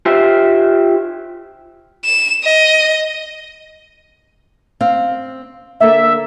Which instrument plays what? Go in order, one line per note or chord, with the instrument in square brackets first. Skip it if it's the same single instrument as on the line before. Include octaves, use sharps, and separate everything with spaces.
[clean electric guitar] F4 G4 C5 E5
[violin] E7
D#5
[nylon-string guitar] C4 F5
[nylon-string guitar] D3 A#3 A4 [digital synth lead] E5